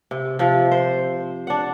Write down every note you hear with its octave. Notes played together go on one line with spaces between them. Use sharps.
C3
C3 F3
C5
D4 F#5